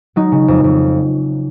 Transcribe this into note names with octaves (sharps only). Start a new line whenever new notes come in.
F#3 D#4
C#3
F2
F2